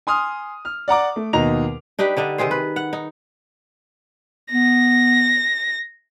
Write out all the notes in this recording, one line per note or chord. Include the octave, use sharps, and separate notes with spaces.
G#5 C6 D#6 F6
F6
D5 F#5 A#5 D6
A3
D#2 B2 D#5 A#5 F7
D4 D#4 G4 B4
D3 D4 D#4
C3 D#3 G#4 C5
B4
F#5
D#4
B3 A#6